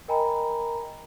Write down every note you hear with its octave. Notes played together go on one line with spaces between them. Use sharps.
A#4 D#5 G5 G#5 A#5 B5